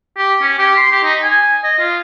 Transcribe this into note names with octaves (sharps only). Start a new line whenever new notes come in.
G4
C#4
G4
C6
G4
D#4
G#5
D#5
F4